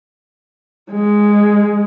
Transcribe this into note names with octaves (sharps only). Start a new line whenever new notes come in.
G#3